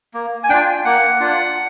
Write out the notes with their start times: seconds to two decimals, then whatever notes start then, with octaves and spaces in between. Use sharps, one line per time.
0.14 A#3
0.44 G#5
0.49 D4 F4 G5
0.85 A#3 F#5
1.20 D4 F4